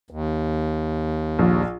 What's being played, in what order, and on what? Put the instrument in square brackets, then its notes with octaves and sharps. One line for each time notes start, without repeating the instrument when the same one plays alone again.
[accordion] D#2
[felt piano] A#1